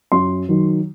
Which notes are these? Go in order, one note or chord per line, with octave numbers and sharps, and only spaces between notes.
F#2 C6
D#3 F#3